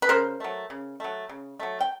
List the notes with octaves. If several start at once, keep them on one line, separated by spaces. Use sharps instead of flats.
B4
C#3 A#4 C5
F#3 A3
C#3
F#3 A3
C#3
F#3 A3
G5